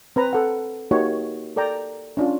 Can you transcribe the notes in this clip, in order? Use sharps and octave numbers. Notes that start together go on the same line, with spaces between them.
C4 B4 A#5
A4 F#5
A#3 D#4 F#4 G4 C#5
A4 A#4 D5 G5 A#5
C#4 D4 F4